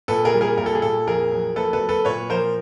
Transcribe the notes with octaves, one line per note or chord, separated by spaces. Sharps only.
A#2 A4 B4
G#4 A#4
G3
G#4 A#4
A#2 A#4
A4
G#4
A#2 A4
F2 G#4 A#4
F#3
A#3 A4 B4
A4 B4
F#3
A4 B4
A#2 B4 C#5
F3 A#4 C5